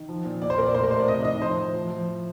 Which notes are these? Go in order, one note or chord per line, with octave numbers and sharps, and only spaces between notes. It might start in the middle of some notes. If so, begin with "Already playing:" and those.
Already playing: D#3
F3
A#2
A#2 D5
C5
A#2 A#4
D5
A2 C5
A#4
A2 C5
D5
C3 D#5
D#3 D#5
F3 C5
A2
F3
F3